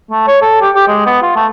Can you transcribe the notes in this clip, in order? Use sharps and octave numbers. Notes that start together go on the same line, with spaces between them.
A3
C#5
A4
G4
G4
G#3
B3
F4
A3